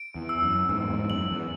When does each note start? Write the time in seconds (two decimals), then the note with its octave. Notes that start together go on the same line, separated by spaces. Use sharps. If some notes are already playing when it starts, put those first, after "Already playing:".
Already playing: D7
0.15 E2
0.29 E6
0.43 F#2
0.69 E2 G#2 E6
0.90 E2 G#2
1.10 F#2 F#7
1.30 E2